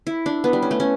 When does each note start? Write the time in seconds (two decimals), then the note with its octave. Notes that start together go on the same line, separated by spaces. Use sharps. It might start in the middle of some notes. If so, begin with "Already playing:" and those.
0.07 E4
0.26 D4
0.44 B3
0.53 G3
0.62 C#4
0.71 A3
0.80 C#4